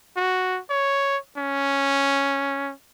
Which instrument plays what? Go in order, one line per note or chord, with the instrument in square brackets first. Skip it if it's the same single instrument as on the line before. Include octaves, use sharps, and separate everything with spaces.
[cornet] F#4
C#5
C#4